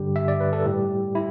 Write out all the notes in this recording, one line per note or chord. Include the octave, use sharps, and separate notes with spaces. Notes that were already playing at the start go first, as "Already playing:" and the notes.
Already playing: G2 D3 G3 G4
E5
D5
B4
A4
A2 G3 G4
E4